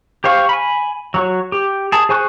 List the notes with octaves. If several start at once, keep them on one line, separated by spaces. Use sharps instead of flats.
G4 C5 F5 C#6
G#5 B5
F#3 F#4 C#5
G4
G#4 A5
G#4 C5 G#5 C#6 F#6